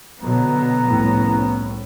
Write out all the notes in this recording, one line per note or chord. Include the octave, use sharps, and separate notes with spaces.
B2 D3 F#3 B3 A#5
C2 F2 A2 C#4